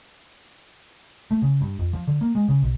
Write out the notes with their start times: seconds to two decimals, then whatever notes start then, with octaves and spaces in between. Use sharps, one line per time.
1.31 A3
1.42 C#3
1.61 G2
1.79 F2
1.93 F3
2.07 D3
2.21 A#3
2.35 G#3
2.48 C#3
2.62 B1